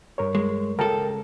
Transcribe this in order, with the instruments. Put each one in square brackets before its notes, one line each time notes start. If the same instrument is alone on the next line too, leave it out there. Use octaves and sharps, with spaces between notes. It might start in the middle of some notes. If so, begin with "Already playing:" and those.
[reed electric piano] G2 A#4 C#5
[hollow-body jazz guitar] G#3
[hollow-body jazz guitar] C#2 A4 [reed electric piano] A#4 G5 A5